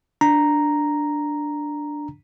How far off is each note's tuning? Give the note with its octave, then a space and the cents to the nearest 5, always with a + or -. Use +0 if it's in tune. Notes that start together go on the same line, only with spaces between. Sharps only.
D4 +0 A#5 +0